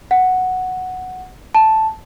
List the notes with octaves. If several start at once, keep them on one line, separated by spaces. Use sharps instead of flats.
F#5
A5